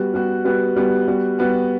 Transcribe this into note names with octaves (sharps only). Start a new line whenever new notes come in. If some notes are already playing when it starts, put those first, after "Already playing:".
Already playing: G3 B3 F#4
G3 B3 F#4
G3 B3 F#4
G3 B3 F#4
G3 B3 F#4
G3 B3 F#4